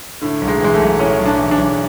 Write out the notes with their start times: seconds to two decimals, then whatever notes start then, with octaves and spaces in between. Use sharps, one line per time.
0.21 A2 D3
0.41 B1
0.48 G#3
0.60 E3 G#3
0.74 A3
0.80 B1
0.99 A2 C#4
1.19 B1
1.26 D4
1.38 E3
1.51 D4
1.58 B1